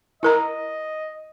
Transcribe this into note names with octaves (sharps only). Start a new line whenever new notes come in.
E4 A#4 D#5 A#5